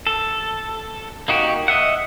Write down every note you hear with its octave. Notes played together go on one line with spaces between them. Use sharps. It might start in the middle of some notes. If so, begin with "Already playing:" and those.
A4
A#3 D#4 F#4 G4
D#5 E5 F#5